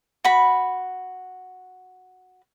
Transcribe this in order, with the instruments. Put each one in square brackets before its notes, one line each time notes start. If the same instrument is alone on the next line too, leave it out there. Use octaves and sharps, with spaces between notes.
[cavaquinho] F#4 B5